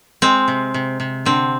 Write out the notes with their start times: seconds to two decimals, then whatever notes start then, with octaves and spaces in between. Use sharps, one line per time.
0.22 G#3 C4
0.48 C3
0.74 C3
1.00 C3
1.25 D3 C4